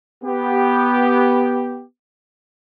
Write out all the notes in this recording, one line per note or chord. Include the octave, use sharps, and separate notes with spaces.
B3 G4